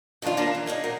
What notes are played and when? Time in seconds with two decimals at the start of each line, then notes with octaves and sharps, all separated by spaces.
0.22 D#3 F3 A3 D4 F4
0.37 A#3 D4 A#4 A5
0.54 E3
0.66 A#3 D4 D#4 G#4
0.84 A#2 A#4 F#5